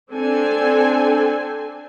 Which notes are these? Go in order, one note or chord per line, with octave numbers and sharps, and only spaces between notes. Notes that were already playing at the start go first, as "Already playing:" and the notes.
C4 D4 A4 G#5